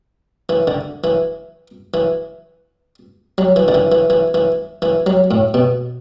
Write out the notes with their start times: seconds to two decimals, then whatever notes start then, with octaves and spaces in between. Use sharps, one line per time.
0.49 E3
0.67 D3
1.04 E3
1.94 E3
3.38 F#3
3.56 E3
3.68 D3
3.74 E3
3.92 E3
4.10 E3
4.34 E3
4.82 E3
5.06 F#3
5.31 A2
5.54 B2